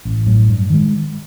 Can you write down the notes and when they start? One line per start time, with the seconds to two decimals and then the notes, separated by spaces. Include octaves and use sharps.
0.05 A1
0.26 A2 F#3
0.48 G2
0.70 D#3 G#3